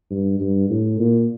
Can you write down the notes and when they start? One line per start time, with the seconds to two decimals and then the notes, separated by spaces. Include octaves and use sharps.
0.10 G2
0.40 G2
0.70 A2
0.99 A#2